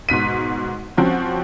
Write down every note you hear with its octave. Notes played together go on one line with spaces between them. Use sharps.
G#2 B2 B6 D#7
F3 C4 C#4 F#4